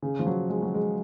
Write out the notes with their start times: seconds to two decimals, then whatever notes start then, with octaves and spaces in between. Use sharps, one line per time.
0.02 C#3
0.19 F3
0.26 F#3
0.49 G#3
0.62 F#3
0.74 G#3